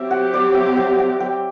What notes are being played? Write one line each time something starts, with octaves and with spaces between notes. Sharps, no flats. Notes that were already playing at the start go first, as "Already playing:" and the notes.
Already playing: F#3 C4 G4 E5
F#5
D5
E5
E5
F#5
G5